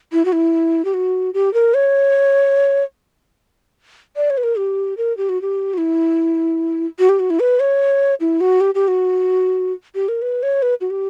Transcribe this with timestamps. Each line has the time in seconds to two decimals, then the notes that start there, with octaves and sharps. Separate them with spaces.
0.12 E4
0.25 F#4
0.33 E4
0.85 G4
0.94 F#4
1.34 G4
1.54 A#4
1.74 C#5
4.16 D5
4.30 C#5
4.37 B4
4.43 A#4
4.58 G4
4.97 A#4
5.17 G4
5.29 F#4
5.42 G4
5.74 F#4
5.78 E4
6.99 F#4
7.09 G4
7.20 F#4
7.30 E4
7.40 B4
7.60 C#5
8.20 E4
8.41 F#4
8.61 G4
8.75 G4
8.88 F#4
9.95 G4
10.08 A#4
10.22 B4
10.43 C#5
10.62 B4
10.81 F#4
10.90 G4